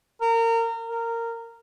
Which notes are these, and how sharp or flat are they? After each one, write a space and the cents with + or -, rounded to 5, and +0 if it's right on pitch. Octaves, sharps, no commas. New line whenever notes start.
A#4 -25
A#4 -15